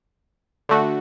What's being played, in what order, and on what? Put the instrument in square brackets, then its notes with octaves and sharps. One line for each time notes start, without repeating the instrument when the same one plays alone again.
[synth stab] D3 A3 F#4